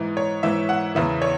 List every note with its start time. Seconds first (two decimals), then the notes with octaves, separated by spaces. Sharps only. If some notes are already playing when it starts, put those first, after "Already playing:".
Already playing: G#2 E3
0.17 C#5
0.43 G#2 E3 E5
0.69 F#5
0.95 E2 C#3 E3 E5
1.22 C#5